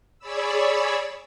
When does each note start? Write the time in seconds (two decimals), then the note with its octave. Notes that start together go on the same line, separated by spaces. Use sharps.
0.19 G#4 C#5 D5 B5 E6